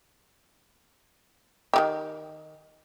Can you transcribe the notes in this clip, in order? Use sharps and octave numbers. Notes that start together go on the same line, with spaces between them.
D#3 E3 G4